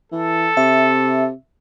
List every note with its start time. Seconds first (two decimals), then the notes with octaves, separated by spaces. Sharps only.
0.12 E3 A4
0.57 C3 E5